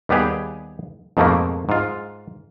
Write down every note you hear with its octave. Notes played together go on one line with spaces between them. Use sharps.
D#2 G3 B3 G4 G#4
F2 G#2 B2 F3 A3 A#3
G#2 F4